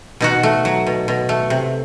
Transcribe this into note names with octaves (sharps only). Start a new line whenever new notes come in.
B2 D#4 F#4
A3
F#3
B2
B2
A3
C3